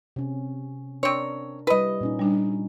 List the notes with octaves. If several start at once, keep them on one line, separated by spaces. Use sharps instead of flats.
C3 C#4
C4 D4 A#4 C#5 C6 C#6
G3 E4 B4 D#5 B5
A#2 C#4 D#4
G3 D4